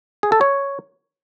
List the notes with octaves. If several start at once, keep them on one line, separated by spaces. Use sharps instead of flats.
G#4
A4
C#5